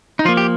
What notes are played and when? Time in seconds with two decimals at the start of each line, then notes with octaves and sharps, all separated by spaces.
0.19 D#4
0.25 F3 F4
0.28 A#3
0.37 G4